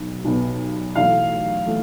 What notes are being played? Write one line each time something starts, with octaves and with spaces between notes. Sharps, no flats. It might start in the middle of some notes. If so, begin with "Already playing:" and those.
Already playing: B1 B2
B1 B2 B3
B1 A2 E3 A3 F5
E3 A3